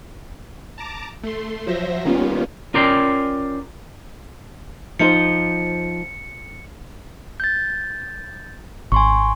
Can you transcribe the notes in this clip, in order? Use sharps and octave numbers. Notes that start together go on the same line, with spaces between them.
A5 A#5 D6
A3 C6
F3 F#3 C5 E5 A#6
D#3 G3 A#3 B3 C#4 F4
C#4 F4 A#4 D5 G5 C6
F3 D#4 C5 C#7
G6 A6
G#1 G#5 C6 C#6